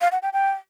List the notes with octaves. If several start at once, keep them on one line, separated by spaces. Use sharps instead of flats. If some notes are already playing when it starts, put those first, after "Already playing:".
F5
F#5
G5
G5